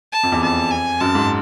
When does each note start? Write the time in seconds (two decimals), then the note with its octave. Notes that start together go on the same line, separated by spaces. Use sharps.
0.13 A5
0.23 F2
0.32 E2
0.43 F2 A5
0.71 G#5
1.01 F#2 A5
1.15 G#2